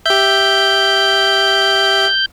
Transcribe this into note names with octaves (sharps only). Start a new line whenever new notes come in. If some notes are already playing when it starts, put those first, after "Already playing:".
G4 E5 G6